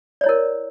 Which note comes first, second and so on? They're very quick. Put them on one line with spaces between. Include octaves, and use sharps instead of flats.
D5 C#5 E4 A#4